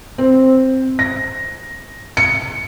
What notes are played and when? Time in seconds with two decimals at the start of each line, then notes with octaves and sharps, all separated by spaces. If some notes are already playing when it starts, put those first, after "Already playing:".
0.18 C4
0.99 A#6
2.17 C#7